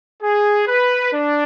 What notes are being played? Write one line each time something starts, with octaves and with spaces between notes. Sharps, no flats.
G#4
B4
D4